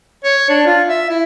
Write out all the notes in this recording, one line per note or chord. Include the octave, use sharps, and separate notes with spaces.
C#5
D4
F4
E5
E4